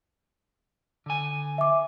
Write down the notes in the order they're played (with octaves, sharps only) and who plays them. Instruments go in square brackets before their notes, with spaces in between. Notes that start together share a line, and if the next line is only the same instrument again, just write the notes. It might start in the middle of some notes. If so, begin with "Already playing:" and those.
[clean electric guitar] D3 G#5
[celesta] E5 D6